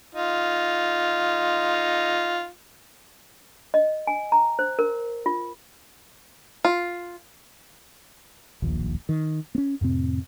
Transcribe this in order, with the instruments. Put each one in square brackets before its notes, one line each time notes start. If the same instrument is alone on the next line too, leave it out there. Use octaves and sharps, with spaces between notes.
[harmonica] D#4 F4
[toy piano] D#5
G#5
A#5
C5
A#4
F4
[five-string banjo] F4
[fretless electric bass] D1 A#1 D#2 A#2
D#3
B3 C#4
F2 A2 C3 C4